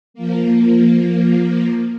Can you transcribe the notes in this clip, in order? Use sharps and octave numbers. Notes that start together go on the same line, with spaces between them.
F3 A#3